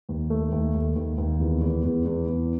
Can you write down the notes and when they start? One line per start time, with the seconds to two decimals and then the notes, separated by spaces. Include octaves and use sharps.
0.09 D#2
0.30 A3
0.52 D#2
0.74 D#2
0.96 D#2
1.18 D#2
1.40 E2
1.61 E2
1.83 E2
2.05 E2
2.27 E2